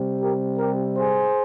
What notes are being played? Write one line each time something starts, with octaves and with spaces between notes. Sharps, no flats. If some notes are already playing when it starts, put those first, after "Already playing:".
Already playing: C3 G3 C4
G4 A#4
G4 A#4
G#4 C5